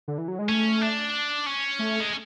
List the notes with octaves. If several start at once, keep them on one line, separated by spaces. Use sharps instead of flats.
D3
E3
F#3
G#3
A3 C#4
D4
C#4
A3
G#3